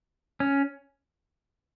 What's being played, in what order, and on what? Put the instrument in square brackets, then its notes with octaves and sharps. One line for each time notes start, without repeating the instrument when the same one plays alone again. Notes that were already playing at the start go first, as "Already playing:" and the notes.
[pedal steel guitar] C#4